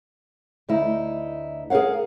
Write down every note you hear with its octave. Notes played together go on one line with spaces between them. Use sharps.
D2 D#4 E4
G#4 A#4 C#5 F5 F#5